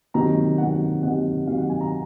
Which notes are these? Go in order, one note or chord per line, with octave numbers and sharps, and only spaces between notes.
C3 D#3 F#3 A#5
C3 D#3 F#3 F#5
C3 D#3 F#3 F#5
C3 D#3 F#3 F5
F#5
G#5
A#5